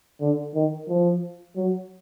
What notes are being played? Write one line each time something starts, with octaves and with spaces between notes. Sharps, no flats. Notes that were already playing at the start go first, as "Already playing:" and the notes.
D3
D#3
F3
F#3